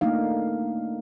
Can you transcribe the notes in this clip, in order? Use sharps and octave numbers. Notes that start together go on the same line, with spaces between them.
A3 A#3 D4 D#4 F5